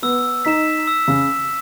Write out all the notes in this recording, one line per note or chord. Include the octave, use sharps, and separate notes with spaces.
B3 E6
D#4 B6 E7
E6
C#3